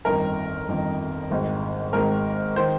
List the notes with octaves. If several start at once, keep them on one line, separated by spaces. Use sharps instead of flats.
G1 F2 D#3 A#4
G1 F2 D#3
G#1 G#2 D#3
G#1 G#2 D#3 A#4
D#3 C5